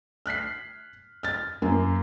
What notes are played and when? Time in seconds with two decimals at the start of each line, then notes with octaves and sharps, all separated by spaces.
0.26 F6 F#6 B6 C7
1.23 F6 A6
1.62 F#2 A#3